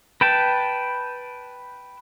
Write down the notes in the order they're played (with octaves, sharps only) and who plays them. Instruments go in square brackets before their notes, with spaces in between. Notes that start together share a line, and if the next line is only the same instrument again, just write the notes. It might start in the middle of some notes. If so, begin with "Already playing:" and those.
[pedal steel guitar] B4 G5 A5